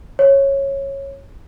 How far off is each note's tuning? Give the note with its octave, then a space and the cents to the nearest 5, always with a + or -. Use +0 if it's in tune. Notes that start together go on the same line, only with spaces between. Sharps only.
C#5 -15